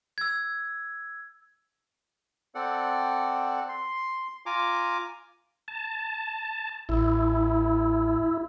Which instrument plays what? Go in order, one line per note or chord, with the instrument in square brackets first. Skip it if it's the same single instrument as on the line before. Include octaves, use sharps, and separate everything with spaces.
[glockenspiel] E6 G#6
[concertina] C4 A4 D5 F#5
C6
F4 G#5 A#5 D6
[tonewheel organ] A5
[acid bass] A1 [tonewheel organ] E4